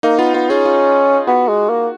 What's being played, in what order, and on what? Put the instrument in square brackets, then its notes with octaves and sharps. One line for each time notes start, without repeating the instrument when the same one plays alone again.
[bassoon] A#3 [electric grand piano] D#4
[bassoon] B3 [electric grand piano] F4
[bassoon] B3 [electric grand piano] F4
[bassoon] C#4 [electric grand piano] G#4
[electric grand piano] F4
[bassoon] B3 [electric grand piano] F#4
[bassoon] G#3
A#3